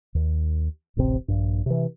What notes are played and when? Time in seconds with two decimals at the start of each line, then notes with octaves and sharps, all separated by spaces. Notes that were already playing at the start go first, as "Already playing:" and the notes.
0.15 D#2
0.97 D1 A1 C3 C4
1.28 A#1 G2
1.66 C3 E3